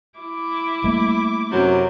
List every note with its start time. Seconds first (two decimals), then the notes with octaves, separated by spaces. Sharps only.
0.20 E4 D6
0.84 G3 A3 A#3
1.50 F#2 C3 F#3